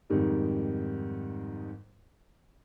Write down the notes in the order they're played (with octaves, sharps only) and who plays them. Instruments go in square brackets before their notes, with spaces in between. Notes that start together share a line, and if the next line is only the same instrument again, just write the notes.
[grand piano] F2 G#2 D#3 G3